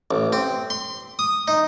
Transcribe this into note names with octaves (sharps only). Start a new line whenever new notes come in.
A1
C4
C6
D#6
D#4